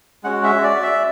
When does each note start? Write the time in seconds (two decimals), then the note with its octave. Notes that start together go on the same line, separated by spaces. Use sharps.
0.24 G#3 C#4 F#4 F#5
0.44 E5
0.63 D5
0.83 E5